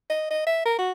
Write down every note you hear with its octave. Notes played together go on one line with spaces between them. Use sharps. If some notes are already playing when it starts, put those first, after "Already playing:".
D#5
D#5
E5
A#4
F#4